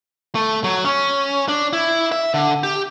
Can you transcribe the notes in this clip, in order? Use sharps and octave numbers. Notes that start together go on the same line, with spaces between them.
A3
F#3
C#4
D4
E4
E5
D3
G4